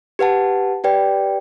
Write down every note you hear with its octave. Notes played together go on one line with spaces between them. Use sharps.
G4 B4 F#5 A5
G4 B4 D5 G5